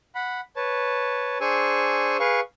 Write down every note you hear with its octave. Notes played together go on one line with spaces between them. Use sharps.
F#5 B5
B4 C#5 A5
D4 G#4 C5 G#5 C#6 E6
G#4 B4 F5 C#6